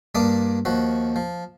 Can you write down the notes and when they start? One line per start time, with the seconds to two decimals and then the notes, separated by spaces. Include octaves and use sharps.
0.15 G2 A#3 D4 D5 D#6
0.65 D#2 F3 F#4
1.16 F3